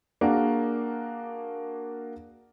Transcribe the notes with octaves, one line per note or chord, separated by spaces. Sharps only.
A#3 D4 F#4 G#4 A#4